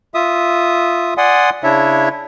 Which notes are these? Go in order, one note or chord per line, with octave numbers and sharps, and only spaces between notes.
F4 E5 D#6
D5 F#5 G#5 C6 D#6
C#3 D4 E4 C#5 E5